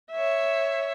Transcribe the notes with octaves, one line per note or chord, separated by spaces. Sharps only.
C#5 E5